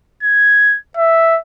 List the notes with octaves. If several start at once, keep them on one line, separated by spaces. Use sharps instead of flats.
G#6
E5